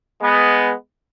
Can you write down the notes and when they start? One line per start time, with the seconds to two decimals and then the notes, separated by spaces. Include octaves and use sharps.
0.20 G#3 B3